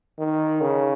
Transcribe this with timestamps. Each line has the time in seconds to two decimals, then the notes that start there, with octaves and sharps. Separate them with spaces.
0.19 D#3
0.61 C#3